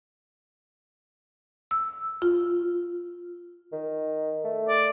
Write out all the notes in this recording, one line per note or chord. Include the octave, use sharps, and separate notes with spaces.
E6
F4
D#3
A3
D5